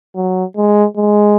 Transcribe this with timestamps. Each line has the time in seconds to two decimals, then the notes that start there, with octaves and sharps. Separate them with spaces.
0.15 F#3
0.56 G#3
0.97 G#3